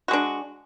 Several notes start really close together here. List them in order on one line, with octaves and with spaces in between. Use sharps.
F#4 G#3 D4